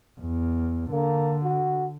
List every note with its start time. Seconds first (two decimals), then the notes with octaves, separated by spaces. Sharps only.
0.21 E2
0.91 D3 A#3
1.43 F#4